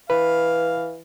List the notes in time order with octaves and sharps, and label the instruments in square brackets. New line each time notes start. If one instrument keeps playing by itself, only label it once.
[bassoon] E3 [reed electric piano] B4 [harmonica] F5